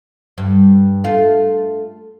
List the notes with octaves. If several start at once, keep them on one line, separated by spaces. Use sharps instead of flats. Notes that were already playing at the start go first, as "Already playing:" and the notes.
G2
A3 F4